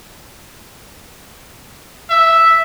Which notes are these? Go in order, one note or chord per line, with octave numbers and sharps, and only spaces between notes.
E5